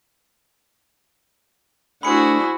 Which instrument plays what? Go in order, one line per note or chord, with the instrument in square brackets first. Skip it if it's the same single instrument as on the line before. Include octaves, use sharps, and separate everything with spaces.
[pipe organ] A3 D4 [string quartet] E4 G#4 C5 [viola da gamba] F#4 [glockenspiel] B5 C#7